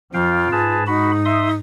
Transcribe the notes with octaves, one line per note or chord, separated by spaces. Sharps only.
F2 F3 F4 F5 G5
G#2 G#4 B4 A5
D#4 F#4 B5
E5 C6 D#6